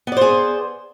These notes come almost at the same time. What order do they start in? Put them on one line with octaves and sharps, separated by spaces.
B3 D5 C5 G#4